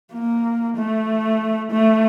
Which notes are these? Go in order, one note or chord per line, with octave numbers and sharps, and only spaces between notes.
A#3
A3
A3